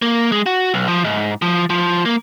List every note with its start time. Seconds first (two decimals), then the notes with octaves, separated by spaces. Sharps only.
0.02 A#3
0.32 G#3
0.46 F#4
0.74 B1
0.88 F3
1.05 G#2
1.42 F3
1.70 F3
2.06 A#3